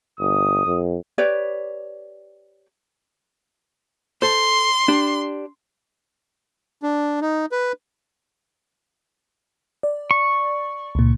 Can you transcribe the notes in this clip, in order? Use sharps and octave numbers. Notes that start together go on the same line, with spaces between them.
G1 D#6
F2
G4 B4 C#5 D5
A4 C5 C6
D4 G4
D4
D#4
B4
D5
C#6
C#2 A#2